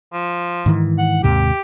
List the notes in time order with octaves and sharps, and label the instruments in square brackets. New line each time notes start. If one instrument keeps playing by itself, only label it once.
[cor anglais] F3
[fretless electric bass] G#2 D#3 E3
[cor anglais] F#5
[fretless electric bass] D#2 G#2 C3 [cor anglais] G4